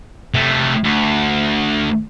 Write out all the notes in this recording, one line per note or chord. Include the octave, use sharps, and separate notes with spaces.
C3 A3
D2